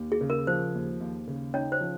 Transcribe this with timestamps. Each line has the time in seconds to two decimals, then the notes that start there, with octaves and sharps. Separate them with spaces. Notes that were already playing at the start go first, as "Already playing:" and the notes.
Already playing: D#2
0.12 G#4
0.21 C#3
0.30 A#4
0.47 F3 C5
0.74 D#2
1.00 D#2
1.27 C#3
1.54 C#4 D#4 C#5
1.72 C5
1.80 F3